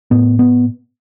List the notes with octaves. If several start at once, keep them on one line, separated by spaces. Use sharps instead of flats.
A2 B3
B3